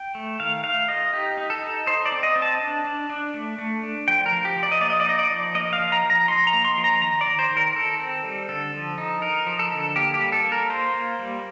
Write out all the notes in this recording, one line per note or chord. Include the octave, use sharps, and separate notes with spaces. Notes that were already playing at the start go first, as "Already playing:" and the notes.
Already playing: G5
A3
D#3 F5
A3 F5
F4 D#5
D#4 G4
D#4
A4
D#4
D#4 C5
D5
C4
D#5
C4
A5
D4
D4
D4
A3
A3
D4
F3 G5
A#4
F3
G4
F3
D5
D#5
A#3 D5
D#5
D5
D#4 D#5
D5
F3
A#3 D#5
F5
F3
A#5
F3
A#5
D#4 C6
A#5
A#3
C6
F3
A#5
D#3 A#5
D5
D#3
C5
D#3
A#4
D#3 A4
C4
G3
D3 A4
F3
D#4
D#4 A#4
F3
A4
D3
A#3 G4
G4
G3
A4
A#3
A#4
F4 C5
A#3
G3